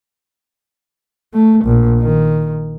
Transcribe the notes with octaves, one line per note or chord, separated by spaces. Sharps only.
A3
A#1
D#3